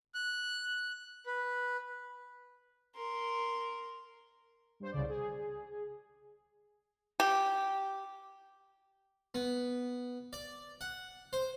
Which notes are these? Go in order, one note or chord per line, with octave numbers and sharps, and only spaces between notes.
F#6
B4
A#4 C6
G2 C5
C2 C#3 D5
G#4
G4
B3
D5
F#5
C5